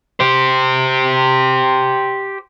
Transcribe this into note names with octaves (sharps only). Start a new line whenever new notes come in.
G4 C5